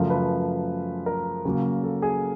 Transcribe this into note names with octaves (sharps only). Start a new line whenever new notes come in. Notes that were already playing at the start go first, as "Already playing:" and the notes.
Already playing: F#2 C#3 F3 A3 A#4
B4
A#4
C#3 F#3 A#3
A4
G#4